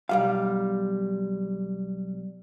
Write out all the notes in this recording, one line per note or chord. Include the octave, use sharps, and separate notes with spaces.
B1 G3 F5